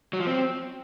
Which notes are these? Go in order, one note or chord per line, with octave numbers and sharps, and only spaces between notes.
F#3
F3
C4